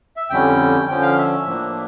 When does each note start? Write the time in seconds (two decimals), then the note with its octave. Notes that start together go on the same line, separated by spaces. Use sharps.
0.17 E5
0.30 F2 D3 G3 C#4 G5
0.89 D3 F3 C#4 G5
1.02 F5
1.18 E5
1.46 A2 F3 A#3 D4